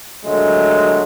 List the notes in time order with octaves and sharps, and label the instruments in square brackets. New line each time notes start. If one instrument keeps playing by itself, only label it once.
[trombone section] D#2 D3 F#3 G#3 A3